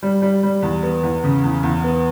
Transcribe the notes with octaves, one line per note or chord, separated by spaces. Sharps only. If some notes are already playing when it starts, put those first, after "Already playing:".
G3
G3
G3
E2
B3
E2
C#3
E2
E2
B3